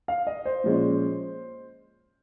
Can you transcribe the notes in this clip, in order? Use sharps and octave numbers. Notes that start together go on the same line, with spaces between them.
F5
D#5
C5
A#2 F3 G#3 C#4